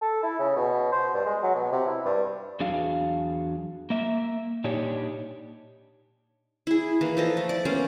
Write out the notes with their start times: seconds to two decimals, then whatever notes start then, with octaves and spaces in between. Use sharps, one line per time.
0.02 A4
0.23 E4
0.39 C#3
0.56 B2
0.92 C5
1.13 G2
1.26 G#3
1.43 F#3
1.55 B2
1.72 C3
1.86 E4
2.05 G2
2.60 E2 F#3 D4 F#4 G#4 F5
3.90 A#3 E5
4.64 A#2 D4 D#4 G4 C#5
6.67 E4 G#4
7.01 E3 A#3
7.17 F3 A4 D#5
7.37 A3
7.49 D5
7.65 A#3 B3 C#4 C5